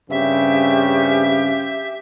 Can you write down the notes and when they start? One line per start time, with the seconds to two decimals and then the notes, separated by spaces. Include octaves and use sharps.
0.10 G2 C#3 C4 C#4 G4 E5